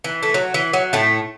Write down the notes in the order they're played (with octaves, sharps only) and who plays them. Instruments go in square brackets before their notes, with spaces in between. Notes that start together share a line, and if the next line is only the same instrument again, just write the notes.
[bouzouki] E3
A3
F#3
E3
F#3
A2 A3